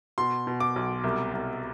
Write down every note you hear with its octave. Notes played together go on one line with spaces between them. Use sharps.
B2 C6
B2
D6
B1
C2
C2